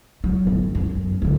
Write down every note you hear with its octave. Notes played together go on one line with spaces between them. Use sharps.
F#3
G1
F#2
D3 F#3